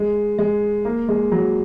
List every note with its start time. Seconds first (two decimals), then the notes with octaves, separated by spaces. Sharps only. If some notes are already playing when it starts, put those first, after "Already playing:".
Already playing: G#3
0.39 G#3
0.85 A#3
1.09 G#3
1.32 F#3